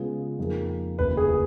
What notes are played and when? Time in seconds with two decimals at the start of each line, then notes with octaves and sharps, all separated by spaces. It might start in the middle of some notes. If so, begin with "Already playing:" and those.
Already playing: C#3 G#3 B3 F4 G#4
0.38 F2 F3 A#3 D#4 G#4
0.98 F1 D#2 C#3 F3 A#3 B4
1.17 G#4